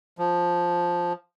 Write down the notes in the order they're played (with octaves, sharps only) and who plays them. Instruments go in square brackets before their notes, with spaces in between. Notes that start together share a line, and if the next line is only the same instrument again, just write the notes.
[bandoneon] F3